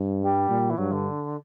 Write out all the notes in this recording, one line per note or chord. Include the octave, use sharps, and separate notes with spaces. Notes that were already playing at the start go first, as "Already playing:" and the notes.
Already playing: G2
G3
A#2
E3
G2 F#3
D3